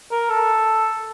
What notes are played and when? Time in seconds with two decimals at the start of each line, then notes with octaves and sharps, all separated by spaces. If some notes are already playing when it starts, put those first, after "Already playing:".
0.12 A#4
0.30 A4